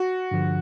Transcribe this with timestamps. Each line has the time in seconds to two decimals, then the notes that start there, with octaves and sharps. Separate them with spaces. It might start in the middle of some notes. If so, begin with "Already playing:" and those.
Already playing: F#4
0.31 G2 D3 F3